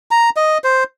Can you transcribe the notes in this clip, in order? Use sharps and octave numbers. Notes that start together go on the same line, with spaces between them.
A#5
D#5
C5